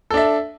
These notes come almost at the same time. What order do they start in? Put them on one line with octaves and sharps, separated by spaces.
A4 D4 E5